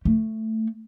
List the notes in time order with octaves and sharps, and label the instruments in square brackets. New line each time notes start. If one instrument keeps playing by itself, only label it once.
[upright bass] A3